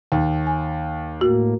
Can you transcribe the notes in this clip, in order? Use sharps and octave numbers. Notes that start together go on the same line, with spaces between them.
D#2 G5
G#5
A2 A#3 F#4